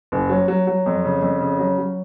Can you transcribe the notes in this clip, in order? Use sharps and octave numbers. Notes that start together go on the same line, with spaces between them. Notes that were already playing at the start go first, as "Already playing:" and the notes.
F#1
F#3
F#3
F#3
F2
C#3
F2
C#3
F#3
F#3